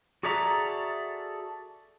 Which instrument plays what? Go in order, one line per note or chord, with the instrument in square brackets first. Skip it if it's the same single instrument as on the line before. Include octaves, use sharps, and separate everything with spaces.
[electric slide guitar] F#4 G#4 A4 D5 E5 A#5